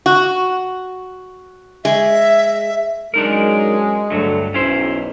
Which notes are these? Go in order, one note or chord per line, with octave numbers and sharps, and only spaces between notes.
F#4
G#3 E5
F#2 F#3 G#3 D4 D#4 A#4
D2 G2 D3 F#3 A3
B1 C#4 E4 C5